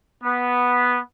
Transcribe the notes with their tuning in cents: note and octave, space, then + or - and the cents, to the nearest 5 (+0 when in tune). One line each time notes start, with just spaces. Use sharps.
B3 -5